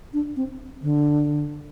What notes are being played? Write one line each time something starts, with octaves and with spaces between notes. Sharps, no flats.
D4
C4
D3